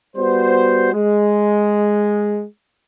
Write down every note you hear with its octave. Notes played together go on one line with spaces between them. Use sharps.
G3 B3 F#4 C5
G#3